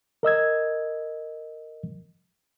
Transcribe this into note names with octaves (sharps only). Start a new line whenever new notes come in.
A#4 D#5 E6 G#6